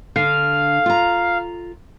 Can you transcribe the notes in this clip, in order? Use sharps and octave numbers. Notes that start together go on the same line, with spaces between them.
D3 F5
F4 A#5